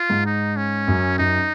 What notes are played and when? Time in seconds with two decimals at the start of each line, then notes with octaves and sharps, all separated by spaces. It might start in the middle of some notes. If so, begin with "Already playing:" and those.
Already playing: F4
0.10 G#2
0.26 D#4
0.56 C#4
0.88 F#2
1.19 F#2 D#4